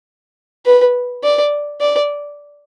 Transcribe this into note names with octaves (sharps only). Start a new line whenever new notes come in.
B4
D5
D5